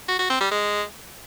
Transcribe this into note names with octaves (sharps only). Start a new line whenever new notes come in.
F#4
F#4
C4
G3
G#3